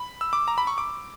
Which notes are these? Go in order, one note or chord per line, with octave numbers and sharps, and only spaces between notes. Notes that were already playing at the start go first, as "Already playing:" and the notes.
Already playing: B5
E6
D6
A#5
B5
C#6
D6